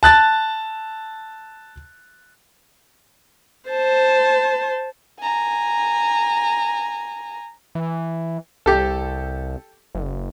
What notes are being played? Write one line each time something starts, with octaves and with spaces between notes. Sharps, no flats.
A5 F#6 A6
C5 A5
G#5 A#5
E3
C2 G4 A4
F#1